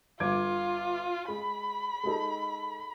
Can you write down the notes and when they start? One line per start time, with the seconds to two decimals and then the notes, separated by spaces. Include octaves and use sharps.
0.20 G1 F4 D6 G#6
1.28 G#3 B5
2.04 G#3 D#4 A4